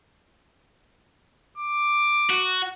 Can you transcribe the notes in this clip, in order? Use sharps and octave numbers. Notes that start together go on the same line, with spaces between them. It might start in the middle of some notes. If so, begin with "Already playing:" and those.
D6
F#4